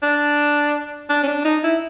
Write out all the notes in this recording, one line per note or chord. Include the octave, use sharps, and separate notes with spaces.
D4
D4
C#4
D4
D#4
E4